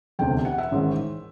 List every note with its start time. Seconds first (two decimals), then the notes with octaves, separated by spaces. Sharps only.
0.19 E1 D2 C3 G5
0.45 F#5
0.58 E5
0.71 A1 G#2 D#3